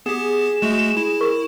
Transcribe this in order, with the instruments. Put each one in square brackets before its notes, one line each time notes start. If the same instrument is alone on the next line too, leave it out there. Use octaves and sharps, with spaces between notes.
[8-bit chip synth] B3 G4 [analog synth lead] G#4 [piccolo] E7
[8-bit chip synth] G#3 A3 F#4
E4
[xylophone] A#4 C#6